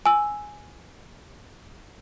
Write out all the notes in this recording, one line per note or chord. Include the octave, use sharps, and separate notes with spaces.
G#5 E6